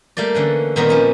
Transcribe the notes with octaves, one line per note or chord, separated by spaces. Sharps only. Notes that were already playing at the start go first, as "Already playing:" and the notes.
G3 A3 A#3 D5
D3 E3 C#4
A#2 D#3 G3 B3 C4 A#4
F3 C#4 D#4